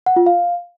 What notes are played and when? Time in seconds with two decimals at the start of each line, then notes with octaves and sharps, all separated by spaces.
0.06 F#5
0.16 F4
0.26 F5